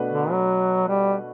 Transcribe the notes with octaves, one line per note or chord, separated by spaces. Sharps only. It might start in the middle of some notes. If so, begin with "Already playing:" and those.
Already playing: B2 A3 D4 F#4 B4
D3
F#3
G3